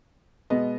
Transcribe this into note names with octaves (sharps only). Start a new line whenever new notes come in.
B2 G#3 B3 D#5